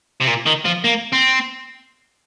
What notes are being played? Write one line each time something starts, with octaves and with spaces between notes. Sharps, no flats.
C3
A#2
D#3
F3
A#3
C4